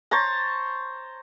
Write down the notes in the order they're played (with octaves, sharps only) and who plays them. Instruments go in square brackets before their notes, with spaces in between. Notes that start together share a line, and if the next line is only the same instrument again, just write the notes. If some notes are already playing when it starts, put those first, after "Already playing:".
[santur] C5 C#5 A5 A#5